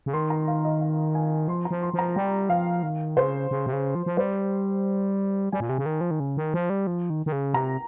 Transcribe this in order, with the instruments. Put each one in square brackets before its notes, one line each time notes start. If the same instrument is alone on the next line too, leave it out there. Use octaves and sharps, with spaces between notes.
[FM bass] C#3
[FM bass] D#3 [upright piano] C6
[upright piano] A#5
F5
D#5
F5
G#5
[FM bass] F3 [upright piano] C6
[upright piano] A#5
[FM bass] F3
[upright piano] C6
[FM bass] F3
[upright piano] A#5
[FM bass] G3 [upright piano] G5
[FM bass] F3 [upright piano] F5
[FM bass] D#3
[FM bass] C#3 [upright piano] C5
[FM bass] C#3
C3
C#3
F3
F3
[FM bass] G3 [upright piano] C5
[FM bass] G3 [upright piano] G#5
[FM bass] A#2
C3
C#3
D#3
F3
D#3
C#3
D#3
F3
G3
F3
D#3
D#3
C#3
[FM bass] C3 [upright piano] A#5